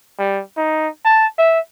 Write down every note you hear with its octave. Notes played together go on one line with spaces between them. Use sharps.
G3
D#4
A5
E5